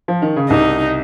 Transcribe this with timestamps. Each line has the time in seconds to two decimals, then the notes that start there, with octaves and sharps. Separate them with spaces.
0.08 F3
0.22 D#3
0.36 C#3
0.50 C2 C3 D#4